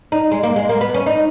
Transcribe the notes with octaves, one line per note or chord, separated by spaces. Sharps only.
D#4
G#3
A#3
G#3
A#3
B3
C#4
D#4